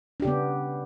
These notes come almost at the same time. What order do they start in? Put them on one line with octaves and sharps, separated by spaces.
D4 G4 C#3 B3